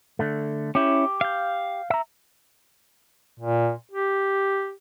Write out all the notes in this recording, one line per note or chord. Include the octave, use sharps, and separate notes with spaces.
D3 A3
C#4 E4 G4
F5 G6
E5 A#5
A#2
G4